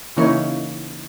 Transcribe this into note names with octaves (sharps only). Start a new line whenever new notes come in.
C#3 E3 A#3 D#4 E4 C#5